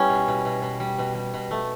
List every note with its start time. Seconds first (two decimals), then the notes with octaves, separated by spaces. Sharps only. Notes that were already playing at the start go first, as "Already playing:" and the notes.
Already playing: G3 B3 C#4 E4
0.09 B2
0.28 B2
0.45 B2
0.62 B2
0.80 G3
0.98 B2
1.15 G3
1.34 B2
1.51 A3